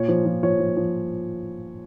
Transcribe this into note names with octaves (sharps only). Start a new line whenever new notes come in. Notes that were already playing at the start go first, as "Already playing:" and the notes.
Already playing: A#2 C#5
F3
F3
F3 C#5
F3
F3